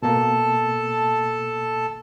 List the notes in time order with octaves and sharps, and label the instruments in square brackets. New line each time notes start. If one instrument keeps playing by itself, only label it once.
[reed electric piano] B2 A#3 [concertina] A4 A5